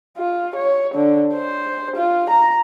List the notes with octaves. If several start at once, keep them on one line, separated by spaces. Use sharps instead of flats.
F4
C#5
D3
C5
F4
A#5